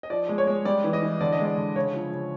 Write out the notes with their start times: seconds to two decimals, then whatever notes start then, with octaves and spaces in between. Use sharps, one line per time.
0.03 D#5
0.10 F3 D5
0.29 G#3
0.38 C#5
0.47 G#3
0.65 G3 D5
0.84 E3
0.93 D#5
1.03 E3
1.21 D3 D5
1.32 D#5
1.39 G#3
1.45 D5
1.57 D3
1.75 C#3 C#5
1.94 F3
2.12 C#3